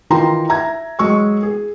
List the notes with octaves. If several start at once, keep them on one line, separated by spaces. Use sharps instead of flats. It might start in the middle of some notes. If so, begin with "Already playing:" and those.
D#3 E3 F4 G5 A#5 C6
E5 A#5 G#6
F#3 G#3 C#6 E6
G#4